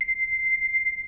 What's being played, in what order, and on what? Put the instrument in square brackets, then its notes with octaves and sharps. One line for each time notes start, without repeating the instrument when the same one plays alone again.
[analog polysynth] C7